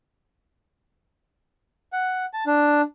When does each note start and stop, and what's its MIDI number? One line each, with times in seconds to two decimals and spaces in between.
1.93 2.25 78
2.33 2.44 81
2.46 2.81 62